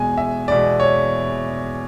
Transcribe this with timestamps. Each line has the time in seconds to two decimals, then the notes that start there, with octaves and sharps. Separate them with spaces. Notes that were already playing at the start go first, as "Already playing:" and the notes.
Already playing: E2 B2 G#3 G#5
0.18 E5
0.48 E2 B2 G#3 D5
0.80 C#5